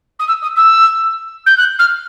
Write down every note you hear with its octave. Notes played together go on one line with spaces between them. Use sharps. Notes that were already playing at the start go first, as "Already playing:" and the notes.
D#6
E6
D#6
E6
G6
F#6
F6